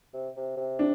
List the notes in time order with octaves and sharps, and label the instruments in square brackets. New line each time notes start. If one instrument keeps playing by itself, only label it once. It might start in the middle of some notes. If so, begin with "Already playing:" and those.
[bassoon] C3
C3
C3
[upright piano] D4